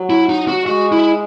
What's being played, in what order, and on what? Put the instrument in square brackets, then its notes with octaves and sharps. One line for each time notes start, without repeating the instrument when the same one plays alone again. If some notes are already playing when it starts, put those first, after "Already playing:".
Already playing: [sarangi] F#3
[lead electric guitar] E4
D#4
F#4
[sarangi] G#3 [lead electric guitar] F#4
[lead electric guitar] E4